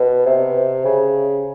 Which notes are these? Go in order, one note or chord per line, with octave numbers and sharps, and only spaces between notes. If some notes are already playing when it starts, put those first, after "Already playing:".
Already playing: B2
C3
C#3